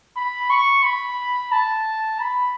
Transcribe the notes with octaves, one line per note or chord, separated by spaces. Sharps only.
B5
C#6
B5
A5
B5